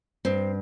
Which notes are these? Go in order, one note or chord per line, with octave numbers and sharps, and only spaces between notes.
G2 C4